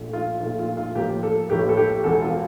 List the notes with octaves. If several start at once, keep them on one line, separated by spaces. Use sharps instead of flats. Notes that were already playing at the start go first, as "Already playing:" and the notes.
Already playing: A#1 A#2 A3
F4
A#1 A#2 A3 F4
F4
F4
A1 A2 F3 A#3 G4
A4
A1 A2 F3 A#3 G4
A4
G4
E1 E2 E3 A4
F4